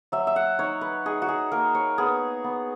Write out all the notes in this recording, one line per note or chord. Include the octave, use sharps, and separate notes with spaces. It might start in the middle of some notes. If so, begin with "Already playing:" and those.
F#3 E5
E5
F#5
D#4 C#5
B4
D#4 G#4
F#4
G#4
A#3 A#4
C#5
B3 G#4
B3